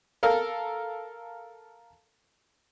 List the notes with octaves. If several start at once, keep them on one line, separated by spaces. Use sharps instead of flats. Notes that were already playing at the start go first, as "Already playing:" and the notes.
A4 A#4 F5